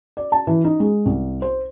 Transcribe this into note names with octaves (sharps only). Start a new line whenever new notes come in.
D5
A5
E3
D#4
G#3
C2
C5